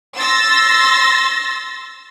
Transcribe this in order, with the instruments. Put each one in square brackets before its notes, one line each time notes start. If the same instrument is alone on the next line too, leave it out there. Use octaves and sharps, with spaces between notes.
[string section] C6 E6 A6 A#6